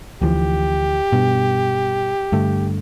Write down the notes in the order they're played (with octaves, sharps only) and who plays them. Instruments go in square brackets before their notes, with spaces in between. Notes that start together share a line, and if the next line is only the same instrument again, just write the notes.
[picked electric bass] D2 E3 F3 [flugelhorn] G4
[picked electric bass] G2 B2
G2 D3 A3